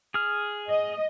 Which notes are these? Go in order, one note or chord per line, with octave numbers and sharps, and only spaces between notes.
G#4 F6
D#5